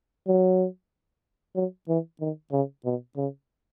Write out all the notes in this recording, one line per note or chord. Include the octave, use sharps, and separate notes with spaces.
F#3
F#3
E3
D#3
C#3
B2
C#3